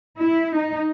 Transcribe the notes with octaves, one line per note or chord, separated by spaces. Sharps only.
E4
D#4